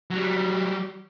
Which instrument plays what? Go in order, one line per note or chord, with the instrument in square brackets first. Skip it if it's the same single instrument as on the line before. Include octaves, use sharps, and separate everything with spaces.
[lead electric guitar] F#3 G3